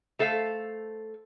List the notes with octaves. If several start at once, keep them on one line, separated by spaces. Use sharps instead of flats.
A3 A4 C5 E5 F5